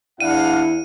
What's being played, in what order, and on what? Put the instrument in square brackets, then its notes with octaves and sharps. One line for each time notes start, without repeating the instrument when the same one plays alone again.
[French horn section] E2 E4 [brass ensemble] D4 F5 F#5 [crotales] D#7